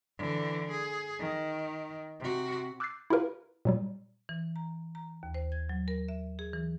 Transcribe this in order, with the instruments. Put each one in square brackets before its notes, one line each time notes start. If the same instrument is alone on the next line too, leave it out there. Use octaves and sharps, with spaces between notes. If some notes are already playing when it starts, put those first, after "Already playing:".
[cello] D3 E3
G#4
D#3
C3 F#4
[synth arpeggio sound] D6 E6 F#6 G6 A6 C7
E4 F4 G4 A#4 B4 F5
A#2 F#3 G3
[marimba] E3
A#5
A#5
D#2
C5
G#6
F#3
A#4
E5
G#4
E3